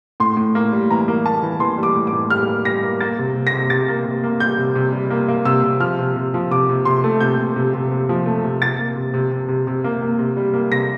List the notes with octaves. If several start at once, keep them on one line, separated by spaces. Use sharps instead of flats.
A2 C6
A2
A#3
G3
E3 A#5
A#3
A#3 A5
E3
E3 C6
G3
D6
A2
D6
A2
G3 F6
A#3
G3 A#6
A#3
A#3 A6
C3
C3
A#6
C3
C3 A6
A#3
C3
A#3
G3 G6
C3
C3
G3
A#3
A#3
C3 E6
C3
F3 F6
C3
C3
F3
C3 D6
C3
C3 C6
A3
C3 G6
C3
C3
C3
C3
F3
A3
C3
C3 A6
A#3
C3
C3
C3
C3
C3
A#3
A#3
C3
G3
A#3
C3 A#6